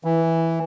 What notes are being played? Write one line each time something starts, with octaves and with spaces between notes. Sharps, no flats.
E3